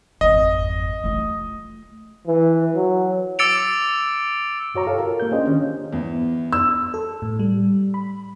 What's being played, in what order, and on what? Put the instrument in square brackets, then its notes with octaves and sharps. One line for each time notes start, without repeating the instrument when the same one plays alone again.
[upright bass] G#1 F2 [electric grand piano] D#5
[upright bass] A3 F4
[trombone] E3
F#3
[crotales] D6 E6 A6 C#7 D7 F7
[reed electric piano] G2 F#4 C#5 A#5
F4 G4 A4 F5
F4 A#4
A#3 F4 G6
C#4 D4 G4 G#4 C5 D#5
D#3 C#4 D4
[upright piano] E2
E6
[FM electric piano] A4
A2
G3
B5